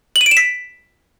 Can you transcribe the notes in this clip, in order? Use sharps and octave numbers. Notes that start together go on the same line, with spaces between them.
F#7
D#7
D7
E7
B6